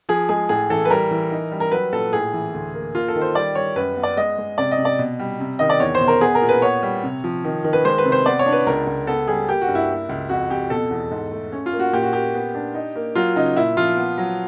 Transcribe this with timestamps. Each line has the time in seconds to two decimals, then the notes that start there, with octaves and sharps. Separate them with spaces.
0.09 F3 G#4
0.29 G#3 G#4
0.49 A2 G#4
0.70 E3 A4
0.85 B4
0.90 G3 A#4
1.11 E3
1.32 D#4
1.52 G3
1.60 A#4
1.72 F#3 B4
1.93 A#2 A4
2.13 A2 G#4
2.33 E3
2.54 D2
2.74 A#3
2.95 A#3 F4
3.08 A4
3.16 D#3
3.22 C5
3.35 G3 D5
3.55 G3 C#5
3.76 F#2 B4
3.96 B3
4.03 D5
4.17 G#3 D#5
4.38 G#3
4.58 C3 D5
4.71 D#5
4.78 C3
4.85 D5
4.99 B2
5.19 G3
5.40 C3
5.59 D#3 D#5
5.70 D5
5.80 E2 C#5
5.95 C5
6.01 B2
6.08 A#4
6.21 B3 G#4
6.35 A#4
6.42 A#2
6.49 B4
6.62 B3 C#5
6.83 G3
7.03 C3
7.24 F3
7.44 D#3
7.64 D#3
7.73 B4
7.85 G#3 C5
7.98 B4
8.05 C3
8.12 C5
8.26 B3 D5
8.39 C#5
8.46 D4
8.52 B4
8.67 C#2 A#4
8.87 C#2
9.07 B3 A4
9.28 G3 G#4
9.48 A#3 G4
9.62 F#4
9.68 G2
9.75 E4
9.89 A#3
10.09 C#2
10.29 F2 F#4
10.50 F2 G4
10.70 B2 A4
10.91 E2
11.11 G#2
11.32 A3
11.52 C#4
11.66 F4
11.73 A#3
11.80 F#4
11.93 A#2 G4
12.03 F#4
12.13 A#3 G4
12.34 B3
12.55 D4
12.74 D#4
12.96 A#3
13.16 F#3 F4
13.36 C#3 D#4
13.56 A#2 E4
13.77 F3 F4
13.97 B3
14.18 F#3